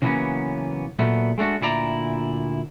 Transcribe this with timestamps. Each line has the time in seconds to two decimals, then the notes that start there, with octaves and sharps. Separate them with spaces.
0.02 C#3 E3 F#3 A#3 B3 C#4
0.99 A#2 F#3 A3 B3
1.38 G#3 A3 D4 F#4
1.61 D2 A#2 E4 D5 A#5